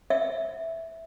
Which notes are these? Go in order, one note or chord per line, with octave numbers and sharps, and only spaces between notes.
E5